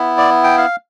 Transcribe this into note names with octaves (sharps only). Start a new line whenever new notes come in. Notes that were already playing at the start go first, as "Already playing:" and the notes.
Already playing: B3 E4
D5
G5
F5